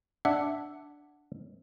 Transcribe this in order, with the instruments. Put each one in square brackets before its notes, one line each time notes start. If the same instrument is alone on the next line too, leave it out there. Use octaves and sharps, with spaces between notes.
[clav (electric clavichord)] D4 E5 [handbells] F#5